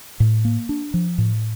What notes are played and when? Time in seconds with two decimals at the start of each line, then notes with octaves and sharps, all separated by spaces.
0.20 A2
0.45 A#3
0.69 D4
0.94 F3
1.18 A2